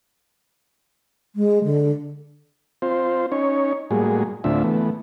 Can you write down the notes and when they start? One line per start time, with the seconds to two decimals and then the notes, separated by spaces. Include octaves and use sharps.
1.36 G#3
1.64 D3
2.82 C4 F4 C5
3.32 C#4 D#4 C#5
3.91 A2 G3 G#3 A#3 F#4 G#4
4.44 D2 A2 C4 D4 F4 E5
4.64 E3 A3 B3